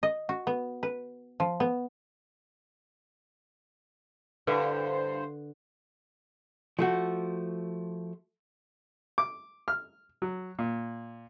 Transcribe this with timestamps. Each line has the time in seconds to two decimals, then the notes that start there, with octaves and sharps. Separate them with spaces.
0.03 D#5
0.29 F#4
0.47 B3
0.83 B4
1.40 F3
1.60 B3
4.47 G2 D3 E4 B4 C5 E5
6.79 F3 A3 F#4
9.18 D6
9.68 F6
10.22 F#3
10.59 A#2